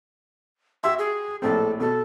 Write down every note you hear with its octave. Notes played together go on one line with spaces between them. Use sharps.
F#4 G4 E5 C6
G#4
A#1 A2 C4 A4
B2 A4